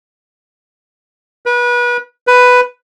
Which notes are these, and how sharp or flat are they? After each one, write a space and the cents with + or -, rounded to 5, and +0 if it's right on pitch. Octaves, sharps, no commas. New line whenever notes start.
B4 -30
B4 +5